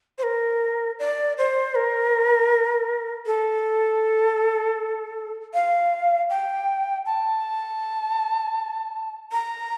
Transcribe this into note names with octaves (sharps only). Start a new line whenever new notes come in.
C5
A#4
D5
C5
A#4
A4
F5
G5
A5
A#5